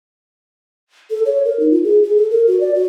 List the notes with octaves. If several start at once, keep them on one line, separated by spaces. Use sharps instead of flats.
A4
C#5
A#4
D#4
F4
G#4
G#4
A4
A#4
F#4
D5
F#4